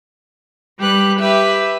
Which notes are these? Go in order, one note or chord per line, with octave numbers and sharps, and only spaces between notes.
G3 G4 B4 F#6
G4 B4 E5